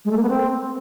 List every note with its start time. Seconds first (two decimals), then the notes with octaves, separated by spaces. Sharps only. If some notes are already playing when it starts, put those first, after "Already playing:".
0.05 G#3
0.11 A3
0.17 A#3
0.23 B3
0.29 C4